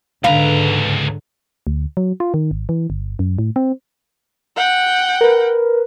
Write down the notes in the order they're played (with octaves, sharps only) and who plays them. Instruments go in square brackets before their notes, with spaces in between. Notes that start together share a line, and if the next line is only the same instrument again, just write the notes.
[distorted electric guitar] C#2 A#5 [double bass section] G#2 D3 [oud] B4 F5
[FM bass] D2
F#3
F4
D#3
G#1
E3
G1
F#2
A2
C4
[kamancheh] F#5 G5
[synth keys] A#4 B4